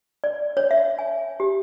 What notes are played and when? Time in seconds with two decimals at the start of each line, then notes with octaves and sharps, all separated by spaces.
0.24 D5
0.57 C#5
0.71 E5
0.99 G#5
1.40 G4